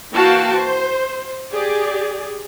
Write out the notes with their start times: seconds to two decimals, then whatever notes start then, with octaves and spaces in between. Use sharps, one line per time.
0.13 E3 A#3 F#4 F5 G5 A5
0.54 C5
1.53 G4 G#4 D5